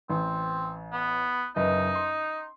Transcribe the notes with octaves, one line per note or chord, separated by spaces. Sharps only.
A1 C4
B3
F#1 D#4 B4 D#5
C6